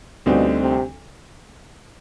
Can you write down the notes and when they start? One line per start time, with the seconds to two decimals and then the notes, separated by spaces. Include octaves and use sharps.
0.26 D2 B2 D3 G3 C4 D#4
0.60 C3